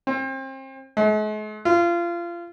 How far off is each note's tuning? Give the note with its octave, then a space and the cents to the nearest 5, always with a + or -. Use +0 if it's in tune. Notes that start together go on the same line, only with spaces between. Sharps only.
C4 +35
G#3 +45
F4 -25